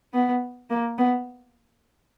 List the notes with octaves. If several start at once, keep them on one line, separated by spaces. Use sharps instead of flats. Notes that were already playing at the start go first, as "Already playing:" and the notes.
B3
A#3
B3